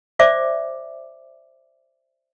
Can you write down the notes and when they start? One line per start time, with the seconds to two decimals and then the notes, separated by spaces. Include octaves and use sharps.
0.19 C5 D5 E5 D6